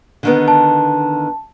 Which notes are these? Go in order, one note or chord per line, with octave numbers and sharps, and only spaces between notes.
D3 D#3 B3
A5